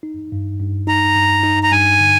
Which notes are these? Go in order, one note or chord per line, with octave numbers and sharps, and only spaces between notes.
D#4
G2
G2
D#4 A#5
G2
D#4
A#5
G2 G#5
D3